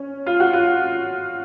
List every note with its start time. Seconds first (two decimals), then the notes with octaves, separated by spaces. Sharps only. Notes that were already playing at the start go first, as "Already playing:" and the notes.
Already playing: C#4
0.26 F4
0.40 F#4
0.53 F4